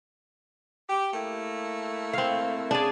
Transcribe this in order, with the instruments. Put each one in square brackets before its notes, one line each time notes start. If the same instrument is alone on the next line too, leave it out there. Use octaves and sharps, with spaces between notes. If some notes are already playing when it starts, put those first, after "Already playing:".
[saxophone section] G4
A3 A#3 E4
[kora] C4 F5
[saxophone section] C#3 G#4 [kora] D4 D5